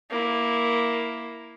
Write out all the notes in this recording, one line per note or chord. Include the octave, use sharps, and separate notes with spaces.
A#3 E4